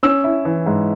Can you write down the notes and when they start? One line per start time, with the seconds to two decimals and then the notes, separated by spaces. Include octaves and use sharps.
0.03 C#4 E6
0.24 E4
0.45 E3
0.66 G#2